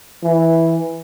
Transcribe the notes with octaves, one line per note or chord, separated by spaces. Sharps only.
E3